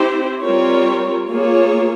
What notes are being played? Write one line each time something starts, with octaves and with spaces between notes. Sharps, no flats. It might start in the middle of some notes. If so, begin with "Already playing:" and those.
Already playing: C4 E4 G4 C5
G3 C4 F4 A#4 C#5
A#3 F4 G#4 C#5